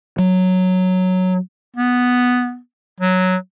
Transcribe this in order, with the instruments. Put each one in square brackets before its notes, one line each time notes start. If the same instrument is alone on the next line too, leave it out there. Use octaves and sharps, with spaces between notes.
[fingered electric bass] F#3
[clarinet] B3
F#3